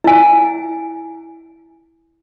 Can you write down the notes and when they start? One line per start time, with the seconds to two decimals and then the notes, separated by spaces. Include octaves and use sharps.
0.04 E4 G#5